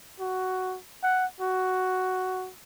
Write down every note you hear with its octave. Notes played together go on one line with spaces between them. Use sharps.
F#4
F#5
F#4